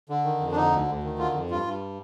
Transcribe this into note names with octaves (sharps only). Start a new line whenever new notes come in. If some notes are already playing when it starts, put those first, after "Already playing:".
D3
D#3
F2
D4
D3 D#4
D2
D2
D#3
D3 F4
F2
G2 F4
G2